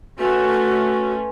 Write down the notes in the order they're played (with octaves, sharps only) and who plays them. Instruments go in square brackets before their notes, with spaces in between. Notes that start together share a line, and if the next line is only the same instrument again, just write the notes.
[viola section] A3 C#4 [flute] F#4 [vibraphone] B4 G#5 C6